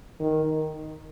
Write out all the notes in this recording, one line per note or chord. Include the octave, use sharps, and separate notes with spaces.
D#3